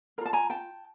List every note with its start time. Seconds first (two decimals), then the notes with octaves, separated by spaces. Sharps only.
0.18 A#4 A#5
0.21 F4 A5
0.33 G#5 A#5
0.50 G5 A5